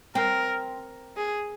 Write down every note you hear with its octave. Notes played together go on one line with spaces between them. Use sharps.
C4 A#4
G#4